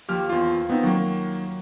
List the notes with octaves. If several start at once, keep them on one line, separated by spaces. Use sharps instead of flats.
D#2 F3 G4 F6
E2 F4
B3 C4 D#4
D#3 F#3 A#3